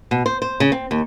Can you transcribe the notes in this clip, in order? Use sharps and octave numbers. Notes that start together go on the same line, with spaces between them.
B2
C5
C5
C#3
C4
D#2